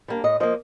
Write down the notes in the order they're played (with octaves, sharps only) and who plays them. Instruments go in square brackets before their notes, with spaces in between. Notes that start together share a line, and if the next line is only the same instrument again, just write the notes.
[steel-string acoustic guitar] G3 A#3 D4
A2 D#5
F3 A#3 D#5